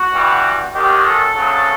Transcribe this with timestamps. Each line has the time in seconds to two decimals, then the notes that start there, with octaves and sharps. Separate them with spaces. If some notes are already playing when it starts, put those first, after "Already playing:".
Already playing: F#4
0.12 G2 E3 G3
0.74 F#2 D#3 G#3 G4
1.05 A4
1.35 D2 C#3 F#3